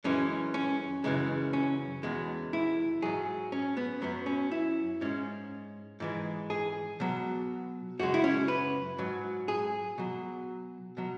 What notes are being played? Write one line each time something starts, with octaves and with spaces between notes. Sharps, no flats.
F#2 E3 G#3 C#4
C#4
F#2 C#3 E3 G#3
C#4
E2 B2 G#3
E4
G#2 F#3 G#4
C#4
B3
F#2 F#3 B3
C#4
E4
G#2 G#3 C#4
G#2 E3 G#3
G#4
B2 F#3
F#2 C#3 G#3 F#4
E4
C#4
B4
G#2 F#3
G#4
B2 F#3
B2 F#3